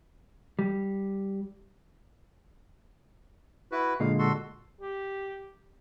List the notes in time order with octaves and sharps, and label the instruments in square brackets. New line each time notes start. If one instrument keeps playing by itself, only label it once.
[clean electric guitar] G3
[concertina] E4 F#4 B4
[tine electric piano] A#2 D3 G#3 [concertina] F5
[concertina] F#4 A4 C6
[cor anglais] G4